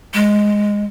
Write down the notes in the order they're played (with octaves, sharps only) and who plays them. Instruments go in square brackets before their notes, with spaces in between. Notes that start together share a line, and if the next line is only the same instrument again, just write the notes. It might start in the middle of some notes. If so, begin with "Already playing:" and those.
[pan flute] G#3